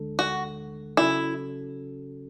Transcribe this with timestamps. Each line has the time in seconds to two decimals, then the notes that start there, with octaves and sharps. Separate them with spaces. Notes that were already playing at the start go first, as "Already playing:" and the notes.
Already playing: D2 D3 G#3 D4 A4
0.19 F#4
0.97 C#3 F#3 C#4 E4 F#4 A4